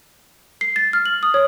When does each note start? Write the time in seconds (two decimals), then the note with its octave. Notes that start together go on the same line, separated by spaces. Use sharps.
0.61 C7
0.76 A6
0.93 F6
1.06 F#7
1.23 D#6
1.34 C#5